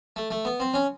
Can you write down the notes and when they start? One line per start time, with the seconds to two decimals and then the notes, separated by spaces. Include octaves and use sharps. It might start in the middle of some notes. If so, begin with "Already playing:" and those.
0.16 A3
0.31 A3
0.45 B3
0.60 C4
0.74 C#4